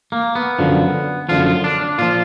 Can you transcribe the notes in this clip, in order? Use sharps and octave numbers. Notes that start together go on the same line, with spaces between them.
A#3
B3
F#2 D3 F3
F#2 D3 F3 F4
F4
D4
D4
A#2 F3 F4